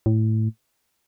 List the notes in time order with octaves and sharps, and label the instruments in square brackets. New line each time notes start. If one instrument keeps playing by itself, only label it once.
[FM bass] A2